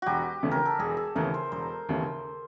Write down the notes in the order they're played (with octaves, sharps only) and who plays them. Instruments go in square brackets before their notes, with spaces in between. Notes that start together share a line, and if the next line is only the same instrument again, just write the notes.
[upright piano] E1 [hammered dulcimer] F#4 G4
[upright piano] D#2 C#3 E3 A3
[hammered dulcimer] A#4
A4
[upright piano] E1 [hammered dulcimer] G#4
[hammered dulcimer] A4
[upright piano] D#2 C#3 E3 A3 [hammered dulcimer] A#4
[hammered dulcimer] C5
[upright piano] E1 [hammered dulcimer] C5
[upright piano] D#2 C#3 E3 A3